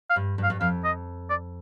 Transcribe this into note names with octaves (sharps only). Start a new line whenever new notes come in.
F5
G2
G2
F5
G2
F2 F5
D#5
D5